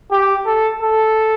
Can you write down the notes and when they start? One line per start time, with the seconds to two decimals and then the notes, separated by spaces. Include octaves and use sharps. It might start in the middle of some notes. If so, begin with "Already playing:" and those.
0.12 G4
0.46 A4
0.81 A4